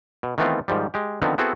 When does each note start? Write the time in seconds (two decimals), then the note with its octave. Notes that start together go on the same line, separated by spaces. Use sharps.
0.23 B2
0.38 D#3 E3 A3 B3 C4 F4
0.68 G#2 D#3 F3 G3
0.94 G#3 G4
1.22 D3 D#3 F3 B3 C4
1.38 B3 C4 E4 F#4 G#4 A4